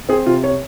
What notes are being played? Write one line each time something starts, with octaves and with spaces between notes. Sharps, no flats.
C4 G#4
C3 F4
C#5